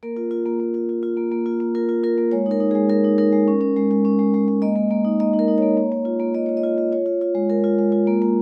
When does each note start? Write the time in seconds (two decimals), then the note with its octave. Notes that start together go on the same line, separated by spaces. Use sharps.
0.03 A#3 A#4
0.17 F4
0.31 F4
0.46 A#3
0.60 A#3
0.74 F4
0.89 F4
1.03 F4
1.17 A#3
1.32 A#3
1.46 F4
1.60 A#3
1.75 F4 A#4
1.89 F4
2.03 F4 A#4
2.18 A#3
2.32 G#3 C#5
2.46 D#4 A#4
2.60 D#4
2.71 G#3 G#4
2.90 G#3 A#4
3.04 D#4
3.18 D#4 A#4
3.33 G#3
3.48 C#4
3.61 C#4
3.76 G#3
3.91 G#3
4.05 C#4
4.19 G#3
4.34 G#3
4.48 G#3
4.62 A#3 D#5
4.76 A#3
4.91 A#3
5.05 D#4
5.20 A#3 D#5
5.33 D#4
5.39 A#4
5.48 D#4
5.58 A#3 C#5
5.77 A#3
5.92 A#3
6.05 F4
6.20 A#3
6.34 A#3 D#5
6.46 F4 C#5
6.57 D#5
6.64 F4
6.78 F4
6.92 F4 C#5
7.06 F4
7.21 F4
7.35 G#3
7.49 G#3 A#4
7.64 F4
7.78 G#3
7.92 F4
8.07 A#3
8.22 A#3